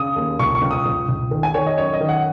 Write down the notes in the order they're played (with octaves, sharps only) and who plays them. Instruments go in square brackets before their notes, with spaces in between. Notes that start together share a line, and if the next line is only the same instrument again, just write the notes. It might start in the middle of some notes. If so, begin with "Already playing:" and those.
Already playing: [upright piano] C#3 D#6
D#2
C#2 C#6
C#6
C#2
D#6
C#2
C#2
D#3
G#5
D#3 C#5
D#5
F#2 C#5
D#5
D#3
F#5